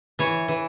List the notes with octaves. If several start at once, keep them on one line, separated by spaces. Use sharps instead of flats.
E3 C#5
E3